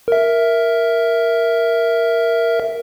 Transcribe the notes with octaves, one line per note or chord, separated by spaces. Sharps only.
A#4 E5